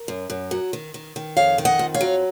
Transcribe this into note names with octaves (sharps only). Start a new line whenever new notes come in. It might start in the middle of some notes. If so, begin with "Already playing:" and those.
Already playing: A#4
F#2
F#2
F#3
D#3
D#3
D#3
F2 C#5 F5
D#3
D#5 F#5
F2
C#5 F5
F#3